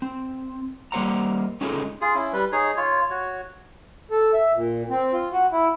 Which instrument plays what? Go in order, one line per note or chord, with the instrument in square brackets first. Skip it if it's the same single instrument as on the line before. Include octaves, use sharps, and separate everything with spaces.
[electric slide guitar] C4
G3 A#3 A4 C5 F#5 A#5
G#3 C#4 D#4 F4 G#4 A4
[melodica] F4 G#4
C#4 E4
G3 B4
D#4 G#4 C#5
F4 C#5
F#4 C#5
[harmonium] A4
E5
A#2
C4
F4
F#4
E4